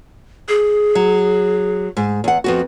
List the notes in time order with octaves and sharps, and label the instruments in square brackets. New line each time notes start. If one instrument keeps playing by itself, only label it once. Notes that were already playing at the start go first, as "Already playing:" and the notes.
[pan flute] G#4
[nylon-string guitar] F#3
G#2
E2 F#5
F2 B3 F#4